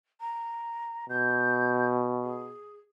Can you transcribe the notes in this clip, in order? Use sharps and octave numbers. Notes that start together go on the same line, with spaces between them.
A#5
B2 G6
G#4